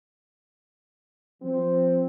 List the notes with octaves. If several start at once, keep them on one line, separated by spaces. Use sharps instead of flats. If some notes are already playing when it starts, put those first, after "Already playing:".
F3 C4